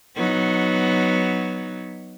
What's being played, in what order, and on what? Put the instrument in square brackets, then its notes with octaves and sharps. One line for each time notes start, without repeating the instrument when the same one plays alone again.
[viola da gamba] F#3 B3 D#4